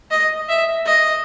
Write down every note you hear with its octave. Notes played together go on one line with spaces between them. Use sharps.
D#5
E5
D#5